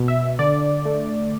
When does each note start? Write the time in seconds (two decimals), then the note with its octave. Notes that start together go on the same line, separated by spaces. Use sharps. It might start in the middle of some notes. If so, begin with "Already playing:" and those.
Already playing: B2
0.08 E5
0.39 D3 D5
0.85 A3